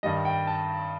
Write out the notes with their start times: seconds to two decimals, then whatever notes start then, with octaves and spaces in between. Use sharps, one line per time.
0.03 G2 D#3 G3 D#5
0.25 G5
0.47 A5